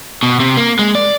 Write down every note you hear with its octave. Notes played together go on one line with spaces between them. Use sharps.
B2
C3
A#3
G#3
D5